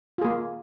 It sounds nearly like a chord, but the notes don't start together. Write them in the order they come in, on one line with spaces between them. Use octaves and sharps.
F4 G#4 A#3